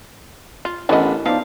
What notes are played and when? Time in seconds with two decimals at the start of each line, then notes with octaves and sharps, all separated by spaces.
0.65 F4
0.89 A1 E3 B3 C#4 D4 E4 A#4 D#5
1.26 F3 B3 D#4 D5 F5